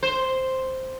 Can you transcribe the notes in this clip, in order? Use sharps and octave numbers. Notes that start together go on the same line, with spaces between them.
C5